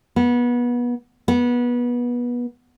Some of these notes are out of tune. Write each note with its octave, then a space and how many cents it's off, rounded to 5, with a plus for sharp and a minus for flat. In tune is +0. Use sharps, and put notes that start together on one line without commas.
B3 -25
B3 -25